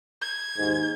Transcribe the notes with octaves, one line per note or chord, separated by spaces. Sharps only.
G#6
D#2 G#2